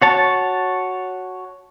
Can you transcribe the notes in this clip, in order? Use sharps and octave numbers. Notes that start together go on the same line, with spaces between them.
F#4 C#5 A5